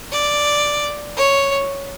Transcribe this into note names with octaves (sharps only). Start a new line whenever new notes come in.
D5
C#5